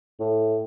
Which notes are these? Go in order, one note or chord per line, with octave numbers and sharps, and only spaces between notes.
A2